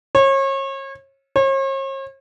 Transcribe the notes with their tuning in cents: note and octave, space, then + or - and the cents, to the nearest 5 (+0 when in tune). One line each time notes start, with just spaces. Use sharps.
C#5 -35
C#5 -45